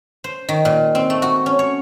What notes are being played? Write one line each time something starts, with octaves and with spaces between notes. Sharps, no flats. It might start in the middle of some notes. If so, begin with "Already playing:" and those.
C5
D#3
A#2
C4
A3
F#4
C#4
C#5